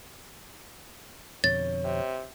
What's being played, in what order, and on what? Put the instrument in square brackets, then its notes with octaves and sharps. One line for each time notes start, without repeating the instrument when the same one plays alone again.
[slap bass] F2 B2 D3 [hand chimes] C#5 [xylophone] A6
[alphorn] C3